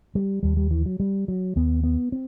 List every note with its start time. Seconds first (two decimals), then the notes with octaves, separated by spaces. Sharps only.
0.15 G3
0.43 D#2 G3
0.57 G3
0.71 E3
0.86 F#3
1.00 G3
1.28 F#3
1.56 D#2 B3
1.84 B3
2.12 C4